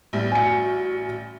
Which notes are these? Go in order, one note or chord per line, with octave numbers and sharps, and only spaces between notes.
A1 G3 B3
F#4 G#5 C#7